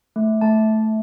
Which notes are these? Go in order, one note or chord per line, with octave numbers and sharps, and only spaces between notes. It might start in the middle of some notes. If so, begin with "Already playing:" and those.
A3
A3 A5